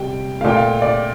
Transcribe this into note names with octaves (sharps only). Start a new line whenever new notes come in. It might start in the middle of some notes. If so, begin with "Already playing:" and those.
Already playing: C3 G3 G5
A#2 A3 F5 G5
F5
D5